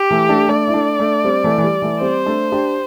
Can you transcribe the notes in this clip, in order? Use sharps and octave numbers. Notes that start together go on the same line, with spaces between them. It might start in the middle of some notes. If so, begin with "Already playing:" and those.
Already playing: G4
E3 A3
A3 D4
A3 D4 D5
E4
A3 D4
A3 D4
G3 C4
E3 A3
E3
G3
E3 A3
G3 C4 C5
A3 D4
D4 G4